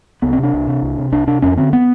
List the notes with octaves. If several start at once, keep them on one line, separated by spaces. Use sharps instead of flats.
C2 B3
C4
C3 D4
C2
C3
C2
C3
C2 D4
C3 D4
F2 C#4
D3 C4
B3